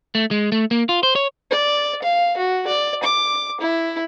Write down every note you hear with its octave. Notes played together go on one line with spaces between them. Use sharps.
A3
G#3
A3
A#3
F4
C5
C#5
D5
F5
F#4
D5
D6
E4